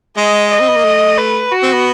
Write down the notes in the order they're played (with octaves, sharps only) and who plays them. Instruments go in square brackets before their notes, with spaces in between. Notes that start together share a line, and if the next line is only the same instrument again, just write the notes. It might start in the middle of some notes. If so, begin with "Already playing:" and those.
[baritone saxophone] G#3 [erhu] D#5
[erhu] D#5
[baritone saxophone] C4
B3
A#3
A3
[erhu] B4
F#4
[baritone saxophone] C4
B3